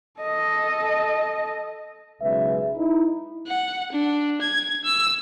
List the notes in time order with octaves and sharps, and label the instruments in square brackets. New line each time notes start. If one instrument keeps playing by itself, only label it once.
[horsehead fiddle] A4 D#5
[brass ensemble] B1 C#3 G#3 B4 E5
D#4 E4
[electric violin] F#5
D4
G#6
E6